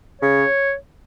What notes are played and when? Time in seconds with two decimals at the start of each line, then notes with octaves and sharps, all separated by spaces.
0.22 C#3 C#5